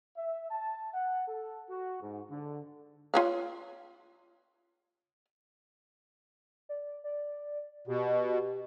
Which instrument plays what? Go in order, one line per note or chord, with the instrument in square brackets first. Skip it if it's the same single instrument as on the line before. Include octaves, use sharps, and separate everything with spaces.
[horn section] E5
A5
F#5
A4
F#4
G#2
D3
[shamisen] F4 C#5 F5
[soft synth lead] D5
D5
[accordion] B2 [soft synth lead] G4